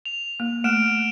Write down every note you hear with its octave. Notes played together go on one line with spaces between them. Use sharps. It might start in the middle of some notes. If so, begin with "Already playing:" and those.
F7
A#3
A3 F6 D7 E7